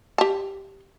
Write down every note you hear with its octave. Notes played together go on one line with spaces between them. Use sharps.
G4 A5